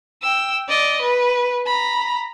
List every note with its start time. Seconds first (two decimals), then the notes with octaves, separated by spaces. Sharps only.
0.22 G5 E6
0.69 D5 D#5
1.01 B4
1.66 A#5 B5